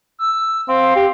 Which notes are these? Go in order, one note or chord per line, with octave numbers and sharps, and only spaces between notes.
E6
C4 F5
G4